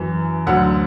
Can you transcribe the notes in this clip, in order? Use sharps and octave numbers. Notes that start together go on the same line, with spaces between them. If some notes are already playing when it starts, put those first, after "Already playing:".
Already playing: F#2 E3
D2 D3 F#3 F#5